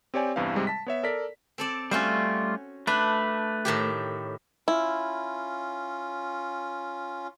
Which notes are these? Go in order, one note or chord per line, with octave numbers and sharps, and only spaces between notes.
C4 G4 C#5 D5 G#5
E2 G2 C3 E3 F5
G#2 C3 G3 G#3
A5 B6
B3 C#5 E5
A4 A#4 D5 B6
C4 A4 D5
G3 A3 C#4 F4 F#4 C5
A3 D4 B4
A2 D#3 G4
C#4 E4 F4